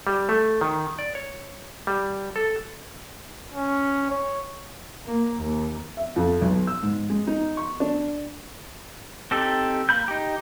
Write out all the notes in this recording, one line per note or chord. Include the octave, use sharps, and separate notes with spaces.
G3
A3
D#3
D5
C#5
G3
A4
C#4
C#5
A#3
D#2
E5
F2
B1
E6
G#2
G#3
D#4
C#6
D4
C4 D#4 G4 A4
A#3 B5 G6
D#4 G4